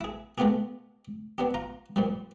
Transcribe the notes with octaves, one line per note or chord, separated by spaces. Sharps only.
E4 G#4
G#3 A3 B3 F4 G4 G#4
B3 D4 G4
F4 A#5
A#2 F3 G3